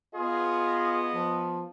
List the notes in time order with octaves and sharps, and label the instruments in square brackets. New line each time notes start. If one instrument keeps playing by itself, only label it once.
[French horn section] B3 D#5 [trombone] F4 [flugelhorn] G#4
[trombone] F3